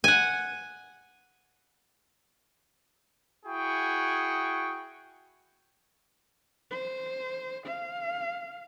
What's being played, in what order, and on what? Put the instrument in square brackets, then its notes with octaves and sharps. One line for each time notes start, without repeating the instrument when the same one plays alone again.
[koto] F#5 G#5
[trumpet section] E4 F#4 G#4 G5 C#6
[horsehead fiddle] C5
F5